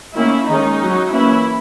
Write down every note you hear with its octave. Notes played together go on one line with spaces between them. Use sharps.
D#3 A#3 C#4 E4
D#3 G#3 C#4 D#4
F#3 C#4
E3 A#3 C#4 E4